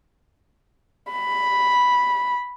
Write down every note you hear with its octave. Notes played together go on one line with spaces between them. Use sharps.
B5